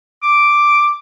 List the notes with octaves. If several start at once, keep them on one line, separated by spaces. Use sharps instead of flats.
D6